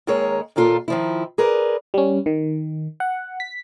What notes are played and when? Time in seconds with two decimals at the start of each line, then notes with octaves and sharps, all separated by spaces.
0.07 D#2 D#3 G#3 G#4 A#4 C#5
0.56 D#2 A#2 A#3 F4 A4
0.88 D#3 F3 E4
1.38 G#4 A#4 B4 D5
1.94 G3 C#4
2.26 D#3
3.00 F#5
3.40 B6